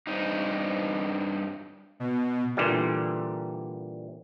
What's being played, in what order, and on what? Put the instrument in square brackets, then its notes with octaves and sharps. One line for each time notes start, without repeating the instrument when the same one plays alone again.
[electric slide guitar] G2 C4 D#4
[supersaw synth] B2
[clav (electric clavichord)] A#2 D3 E3 G3